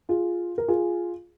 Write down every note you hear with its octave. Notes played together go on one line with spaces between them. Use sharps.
F4 G#4
A#4
F4 G#4